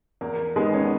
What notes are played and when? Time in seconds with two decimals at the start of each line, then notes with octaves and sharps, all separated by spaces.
0.21 E2 A#3
0.56 D#3 G#3 B3
0.74 C#4
0.82 B3